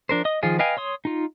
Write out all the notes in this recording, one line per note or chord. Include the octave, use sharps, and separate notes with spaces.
F3 D4 A#4 C5
D#5 D#6
D#3 F3 F4 G#4
B4 D#5 F5 G5 G#5
C#5 C6 D#6
D#4 F4